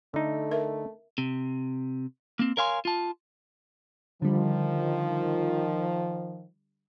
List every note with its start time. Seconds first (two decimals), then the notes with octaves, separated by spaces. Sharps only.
0.14 D3 A3 D#4
0.52 A#4 E5
1.18 C3
2.39 A#3 C4
2.57 A#4 C#5 F5 G#5 C6
2.85 F4 A5
4.22 D3 D#3 F3 G3